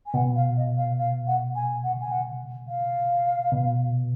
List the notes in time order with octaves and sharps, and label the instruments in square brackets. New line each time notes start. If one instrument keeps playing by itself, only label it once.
[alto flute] G#5
[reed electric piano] B2 [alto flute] F#5
[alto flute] F5
D#5
F5
F5
F#5
G#5
F#5
G#5
F#5
F5
[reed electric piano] B2